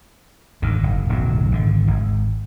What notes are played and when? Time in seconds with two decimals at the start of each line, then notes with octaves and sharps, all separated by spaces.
0.62 G#1 D2 D#3
0.83 F#1
1.09 D1 B1 F#2 F#3
1.52 G#1 D3
1.87 G#1